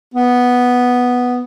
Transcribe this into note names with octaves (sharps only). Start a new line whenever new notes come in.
B3